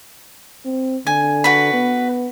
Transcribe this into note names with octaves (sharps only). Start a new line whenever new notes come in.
C4
D3 G#5
F#4 B4 B5
B3